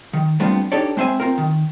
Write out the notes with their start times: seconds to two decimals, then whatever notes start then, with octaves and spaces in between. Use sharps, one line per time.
0.13 D#3
0.40 G3 A3 B3 C4 D4 F4
0.72 D4 D#4 G4 A4 C#5 D5
0.97 G#3 C4 C5 E5 G#5
1.20 C4 F4 A#4
1.38 D#3